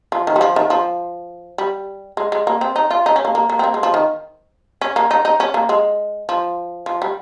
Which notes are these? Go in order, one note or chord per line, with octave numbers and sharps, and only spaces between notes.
F3
D#3
G3
F3
D#3
F3
G3
G#3
G#3
A#3
C4
D#4
F4
D#4
C#4
A#3
A#3
A#3
C4
A#3
G#3
F3
D#3
C#4
A#3
D#4
D#4
C#4
A#3
G#3
F3
F3
G3